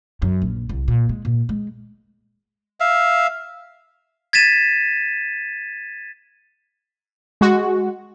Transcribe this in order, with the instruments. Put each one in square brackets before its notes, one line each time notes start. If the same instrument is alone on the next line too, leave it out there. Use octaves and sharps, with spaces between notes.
[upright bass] F#2
A#1
C2
A#2
G#3
A#2
G#3
[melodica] E5 F5
[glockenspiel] G#6 A6 B6 D#7 E7
[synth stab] G#3 F#4